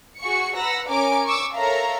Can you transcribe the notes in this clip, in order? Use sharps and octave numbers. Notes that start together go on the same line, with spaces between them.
F#4 G#4 C#6 C#7
B4 F#5 A#5 E6 A#6
C#4 A#4 G#5 D6 D7
C#6 D6 E6
A4 A#4 C#5 E5 F5 A#5